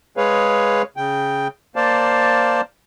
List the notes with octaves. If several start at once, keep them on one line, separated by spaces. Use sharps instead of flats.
G#3 G#4 B4 C#5 F5
C#3 G5
A#3 C5 D5 F5 A5